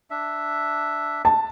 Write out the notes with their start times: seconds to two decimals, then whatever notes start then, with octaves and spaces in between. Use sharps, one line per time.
0.11 D4 E5
1.25 A5